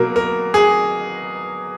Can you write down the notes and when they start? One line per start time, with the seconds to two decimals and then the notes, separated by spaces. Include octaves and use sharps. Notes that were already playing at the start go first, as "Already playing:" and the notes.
Already playing: B2 F#3 A#3 A#4
0.16 A#4
0.54 G#4